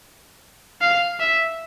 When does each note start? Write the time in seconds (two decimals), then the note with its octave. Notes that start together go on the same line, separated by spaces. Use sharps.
0.81 F5
1.20 E5